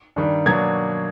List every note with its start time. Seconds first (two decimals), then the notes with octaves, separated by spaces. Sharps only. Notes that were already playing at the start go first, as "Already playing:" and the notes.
0.16 G2 D#3 G3
0.46 B2 F#3 A#3 D4 G#6